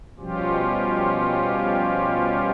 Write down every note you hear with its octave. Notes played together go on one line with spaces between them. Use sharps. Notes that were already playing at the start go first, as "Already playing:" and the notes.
B2 F3 G3 C#4 F4 G4